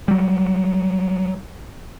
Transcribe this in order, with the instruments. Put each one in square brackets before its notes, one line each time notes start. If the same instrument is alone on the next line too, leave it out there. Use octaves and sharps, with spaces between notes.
[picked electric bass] F#3 G3